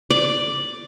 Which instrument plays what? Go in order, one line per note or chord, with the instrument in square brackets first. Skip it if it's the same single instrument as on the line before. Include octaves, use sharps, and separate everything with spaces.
[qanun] D5